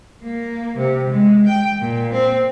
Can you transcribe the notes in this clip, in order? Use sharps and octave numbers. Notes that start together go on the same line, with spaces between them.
A#3
C3
G#3
G5
A#2
C4